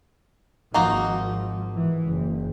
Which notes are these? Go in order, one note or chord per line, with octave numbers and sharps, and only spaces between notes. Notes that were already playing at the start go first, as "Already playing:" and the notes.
G#1 F3 A#3 D#4 F#4
G#2 E3
F#1